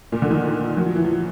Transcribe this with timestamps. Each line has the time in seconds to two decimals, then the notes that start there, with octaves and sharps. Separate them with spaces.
0.12 A#2
0.22 D3
0.31 D#3
0.77 F#3
0.86 F3
0.96 E3
1.05 F3